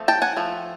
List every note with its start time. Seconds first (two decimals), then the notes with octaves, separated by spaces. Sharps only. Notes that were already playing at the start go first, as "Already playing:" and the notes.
Already playing: F3 A3 C4
0.08 G5 A5
0.22 F#5 G#5
0.37 F3 A3